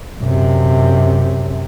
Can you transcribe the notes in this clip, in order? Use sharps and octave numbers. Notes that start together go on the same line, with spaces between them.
F#2 C3